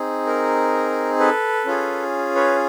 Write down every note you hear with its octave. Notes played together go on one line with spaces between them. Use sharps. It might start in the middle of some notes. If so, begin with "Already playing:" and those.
Already playing: C4 D#4 G#4
A#4
A4 B4
C#4 F4 G#4
B4 C#5